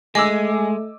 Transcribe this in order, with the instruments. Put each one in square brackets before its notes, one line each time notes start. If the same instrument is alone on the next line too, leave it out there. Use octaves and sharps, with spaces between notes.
[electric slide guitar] G#3 [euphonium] A3 [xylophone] D#5 [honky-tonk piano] G#5 D6 E6